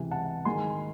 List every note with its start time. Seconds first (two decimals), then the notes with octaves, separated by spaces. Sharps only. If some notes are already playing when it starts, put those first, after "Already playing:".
Already playing: C#2 C3 E3 G#5
0.11 F#5 A5
0.45 G#2 D#3 G#3 G#5 C6